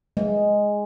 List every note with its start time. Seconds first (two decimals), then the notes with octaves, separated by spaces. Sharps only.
0.17 G#3